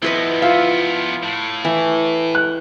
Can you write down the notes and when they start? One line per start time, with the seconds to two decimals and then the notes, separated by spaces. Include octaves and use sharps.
0.03 F3 B3 E4 B4 D#5
0.42 F4 E5 F5
1.23 A2
1.65 E3
2.35 F#6